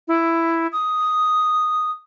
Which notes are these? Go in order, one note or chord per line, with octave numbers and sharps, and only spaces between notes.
E4
D#6